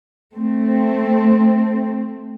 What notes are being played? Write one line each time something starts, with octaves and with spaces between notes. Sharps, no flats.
A3 C4